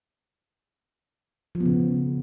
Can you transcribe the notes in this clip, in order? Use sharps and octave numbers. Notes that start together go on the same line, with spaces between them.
F3
B3
C#3